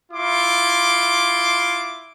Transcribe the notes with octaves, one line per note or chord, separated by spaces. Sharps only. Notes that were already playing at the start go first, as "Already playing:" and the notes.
E4 F4 C6 D6